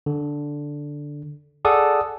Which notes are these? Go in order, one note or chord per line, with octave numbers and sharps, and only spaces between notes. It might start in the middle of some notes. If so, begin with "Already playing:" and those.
D3
G#4 A4 D5 F#5 D#6